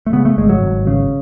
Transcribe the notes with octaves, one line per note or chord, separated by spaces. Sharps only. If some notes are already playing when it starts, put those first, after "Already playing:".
A3
C#3 B3
A3
G#1 G#3
F#3
G#1
C#3